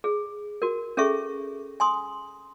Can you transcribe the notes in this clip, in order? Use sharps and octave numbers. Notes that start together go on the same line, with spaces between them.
G#4
F#4 A#4
C#4 G#4 A4 E5 C#6
G#5 C6 D#6